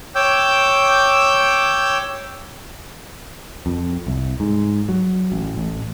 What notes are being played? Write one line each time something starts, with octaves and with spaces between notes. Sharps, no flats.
C#5 G5 D6 E6 G6
F2
C2
G#2
F#3
A1
A1